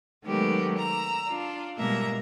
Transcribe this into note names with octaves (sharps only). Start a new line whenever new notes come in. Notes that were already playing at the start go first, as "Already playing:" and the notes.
D#3 F#3 G#3 A3 B3 G4
A#5 E6
D4 F4
B2 G3 G#3 A#3 E5 A#5